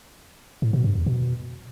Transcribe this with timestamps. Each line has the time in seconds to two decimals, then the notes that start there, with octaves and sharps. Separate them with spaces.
0.62 A2
0.73 B2
0.84 G2
0.95 E2
1.06 B2